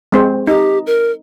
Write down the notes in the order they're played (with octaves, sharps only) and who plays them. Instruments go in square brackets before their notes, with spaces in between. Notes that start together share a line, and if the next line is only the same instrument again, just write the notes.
[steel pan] G#3 C4 C5
[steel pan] D#4 [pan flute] G4
[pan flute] A#4